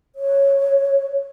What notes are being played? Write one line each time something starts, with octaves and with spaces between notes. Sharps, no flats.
C#5